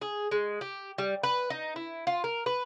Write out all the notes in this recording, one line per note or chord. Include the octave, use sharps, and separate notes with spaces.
G#4
G#3
G4
G3
B4
D#4
E4
F4
A#4
B4